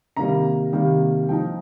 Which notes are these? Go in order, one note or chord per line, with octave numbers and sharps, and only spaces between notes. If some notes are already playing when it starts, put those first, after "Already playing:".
C3 D#3 G3 A#3 A#5
C3 D#3 G3 A#3
F3 D#4 G5